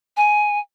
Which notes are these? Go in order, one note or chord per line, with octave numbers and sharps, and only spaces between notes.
G#5